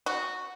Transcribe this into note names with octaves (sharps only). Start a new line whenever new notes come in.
F#4